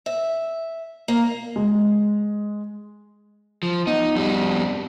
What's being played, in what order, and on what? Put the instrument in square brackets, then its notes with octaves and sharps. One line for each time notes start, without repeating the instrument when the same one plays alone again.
[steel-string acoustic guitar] E5
A#3
[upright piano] G#3
[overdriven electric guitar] F3
[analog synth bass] B3 [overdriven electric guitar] D#4
[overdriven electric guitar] F2 G3